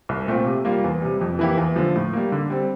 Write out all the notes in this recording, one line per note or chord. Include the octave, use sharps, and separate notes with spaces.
C2
A#2 A3 C4 F4
C3
G3 A#3 F4
E2
C3 G3
F2
E3 A#3 E4 G4
E2
D3 F3
A2
G3 A#3
D3
G3 C4